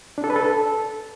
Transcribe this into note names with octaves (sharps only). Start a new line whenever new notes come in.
D4
A4
B4
A4